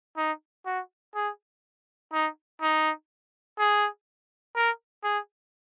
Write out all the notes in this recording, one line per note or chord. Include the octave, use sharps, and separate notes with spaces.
D#4
F#4
G#4
D#4
D#4
G#4
A#4
G#4